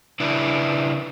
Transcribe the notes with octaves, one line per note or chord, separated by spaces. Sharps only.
C#3 D4 E4 B4 D5